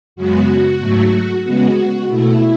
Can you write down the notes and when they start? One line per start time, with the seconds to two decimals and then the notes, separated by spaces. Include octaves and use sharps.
0.16 F#2 C#3 G#3 B3 F#4
0.80 G#2 F#3 A3
1.44 C#3 G#3 B3 F#4
2.08 B2 A3 E4